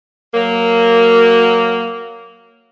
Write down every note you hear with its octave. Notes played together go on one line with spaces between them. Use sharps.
F#3 A#3